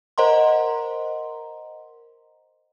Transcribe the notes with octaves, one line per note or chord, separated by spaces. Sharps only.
A#4 C5 D#5 F#5 A#5 C6